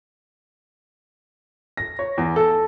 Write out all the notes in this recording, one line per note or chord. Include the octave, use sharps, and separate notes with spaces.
A#6
C#5
E2
A4